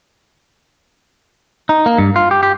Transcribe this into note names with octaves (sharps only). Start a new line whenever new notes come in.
D#4
A#3
G2
F4
G4
G4